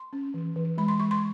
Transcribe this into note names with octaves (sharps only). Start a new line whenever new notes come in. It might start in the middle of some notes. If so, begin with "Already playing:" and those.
Already playing: C6
C#4
E3
E3
G#3 B5
C6
G#3 C#6
C6